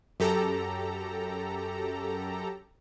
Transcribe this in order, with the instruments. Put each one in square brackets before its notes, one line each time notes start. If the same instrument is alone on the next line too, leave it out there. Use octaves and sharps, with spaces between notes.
[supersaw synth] F#2 G4 A4 A#5